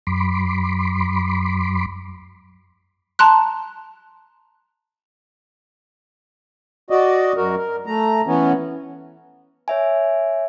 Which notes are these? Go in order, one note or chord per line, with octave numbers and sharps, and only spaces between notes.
F#2 B5 C6 D6
A5 A#5 C6 F#6
F#4 D5 D#5
F#2 F#4 A#4
A#4
A3 A#5
E3 B3 C#4
C#5 E5 G#5